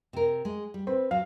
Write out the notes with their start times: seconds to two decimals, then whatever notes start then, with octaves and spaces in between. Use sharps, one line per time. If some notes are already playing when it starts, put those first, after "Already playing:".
0.13 C3 A#4
0.45 G#3
0.74 G3
0.87 C4 B4
1.11 F#3 F5